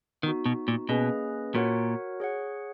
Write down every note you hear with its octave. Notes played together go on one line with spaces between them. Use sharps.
D#3 B3 D#4 F#4
B2
A#2
B2 A#3 C#4 G#4 B4 D#5
A#2 F#4 A#4 C#5 F#5
G#4 C#5 F#5